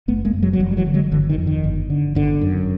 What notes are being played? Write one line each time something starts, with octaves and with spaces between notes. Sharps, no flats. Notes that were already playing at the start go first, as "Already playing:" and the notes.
F#1 A3 B3
G#3 A#3
F#2
F#3 G#3
F#3
F#1 F3 G3
G3
E3 F#3
D3
F#3 G#3
G1 D3 E3
D#3
F2
D#3
G1
D3
G1 D3
F#2